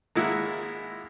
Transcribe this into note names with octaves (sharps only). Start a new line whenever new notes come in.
G#1 G#3 A#3 E4 E5 F#5